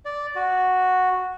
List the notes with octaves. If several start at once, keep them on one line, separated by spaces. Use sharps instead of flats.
D5
F#4